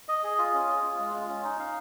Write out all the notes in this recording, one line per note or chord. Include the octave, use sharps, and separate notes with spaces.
D#5
G#4
F4
C#4
G#4
F4
G#3
F4
C#4
D#4
F5